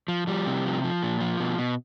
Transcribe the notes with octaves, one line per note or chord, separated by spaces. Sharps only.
F3
F3 G3
C3
F3
F3
A#2
F3
B2
B2